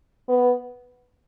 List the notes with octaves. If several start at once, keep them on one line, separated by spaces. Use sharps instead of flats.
B3